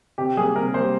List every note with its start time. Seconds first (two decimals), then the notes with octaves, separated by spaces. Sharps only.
0.18 C3 G4
0.37 G3 A#3 G#4
0.55 C3 A#4
0.74 G3 A#3 C5